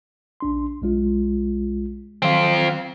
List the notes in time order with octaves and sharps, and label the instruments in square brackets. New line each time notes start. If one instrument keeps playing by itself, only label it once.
[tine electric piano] A#1 D4 C6
B1 G#3 F4
[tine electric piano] D#3 F#3 [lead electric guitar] C4 F4